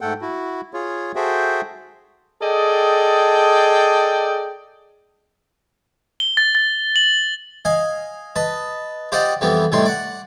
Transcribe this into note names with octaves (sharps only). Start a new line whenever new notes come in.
G#2 A3 A4 F#5 G5
E4 F#4
F4 G#4 C#5
F#4 G#4 A4 C5 E5 G5
G#4 A4 D5 D#5 G5
G7
A6
A6
F#7
D#5 F5 G#5
B4 D#5 A5
F4 G4 C5 D5 D#5 F#5
F2 E3 G3 B3
A2 C3 D#3 G3 E4 C6
D5 F#5